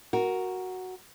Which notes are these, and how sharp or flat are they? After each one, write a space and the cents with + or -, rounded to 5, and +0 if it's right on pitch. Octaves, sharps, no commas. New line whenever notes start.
F#4 +0 A#4 +0